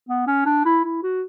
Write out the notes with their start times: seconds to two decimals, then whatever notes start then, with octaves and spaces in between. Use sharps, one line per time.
0.09 B3
0.27 C#4
0.46 D4
0.65 E4
0.84 E4
1.03 F#4